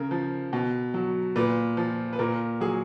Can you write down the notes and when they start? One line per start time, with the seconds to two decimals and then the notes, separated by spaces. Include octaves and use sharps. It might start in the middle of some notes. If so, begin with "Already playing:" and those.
Already playing: C#3 A#4
0.11 F3
0.53 B2
0.94 F#3
1.36 A#2 B4
1.77 F3
2.13 B4
2.19 A#2 A#4
2.61 F#3 G#4